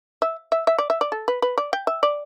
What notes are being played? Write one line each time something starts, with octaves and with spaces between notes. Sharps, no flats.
E5
E5
E5
D5
E5
D5
A4
B4
B4
D5
G5
E5
D5